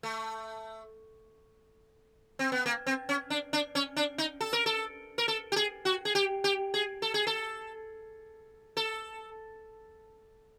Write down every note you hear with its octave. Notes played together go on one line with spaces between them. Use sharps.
A3
C4
B3
A#3
C4
C#4
D4
D4
C#4
D4
D#4
A4
A#4
A4
A#4
A4
G4
G#4
F#4
G#4
G4
G4
G#4
A4
G#4
A4
A4